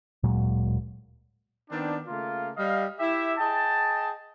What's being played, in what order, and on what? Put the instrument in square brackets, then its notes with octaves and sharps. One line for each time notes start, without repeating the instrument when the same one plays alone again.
[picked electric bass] D1 A#2 F#3 G#3
[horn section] D#3 B3 C4 D4
C#3 A3 A#3 F4
G3 D#5 F5
E4 G4 E5
G#4 D#5 G5 A5